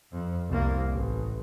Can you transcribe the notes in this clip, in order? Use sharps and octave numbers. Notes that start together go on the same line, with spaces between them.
F2
C2 A#3
A1